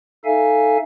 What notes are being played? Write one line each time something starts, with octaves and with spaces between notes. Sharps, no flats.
D#4 A4 E5 F5 G#5